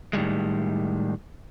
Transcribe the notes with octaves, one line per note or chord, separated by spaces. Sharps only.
A2 D#3 G3 G#3